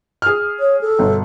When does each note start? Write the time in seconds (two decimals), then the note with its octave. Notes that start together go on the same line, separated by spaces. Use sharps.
0.22 G#4 F6
0.60 C#5
0.81 A4
0.99 G1 B2